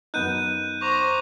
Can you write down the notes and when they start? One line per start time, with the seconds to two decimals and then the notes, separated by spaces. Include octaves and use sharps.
0.14 F#2 B3 D#4 F#6 G6 D#7
0.81 C5 A#5 C#6 D6